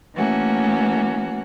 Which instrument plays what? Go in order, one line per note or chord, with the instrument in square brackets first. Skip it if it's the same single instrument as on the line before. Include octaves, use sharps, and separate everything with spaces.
[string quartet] E3 A3 A#3 C#4 F#4